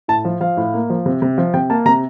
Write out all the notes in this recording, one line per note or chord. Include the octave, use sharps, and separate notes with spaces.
A2 A5
F3
F3 F5
A2
A#3
F3
C3
C3
F3
C3 G5
A#3 A5
C3 A#5